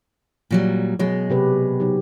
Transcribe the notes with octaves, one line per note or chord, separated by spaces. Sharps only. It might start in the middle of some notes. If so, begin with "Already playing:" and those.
A#2 F#3 G3
B2 F#3 G#3
C3 G4 B4
F#3 D#4 G4